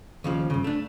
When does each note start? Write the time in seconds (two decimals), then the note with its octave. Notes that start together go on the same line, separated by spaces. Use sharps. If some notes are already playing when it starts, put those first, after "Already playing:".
0.24 D#2 C#3 F3
0.50 G2 C#3
0.64 A3 D4